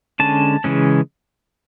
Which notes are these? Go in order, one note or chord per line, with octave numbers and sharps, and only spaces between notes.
D3 G#3 C#4 A5
C#3 E3 G#3 C#4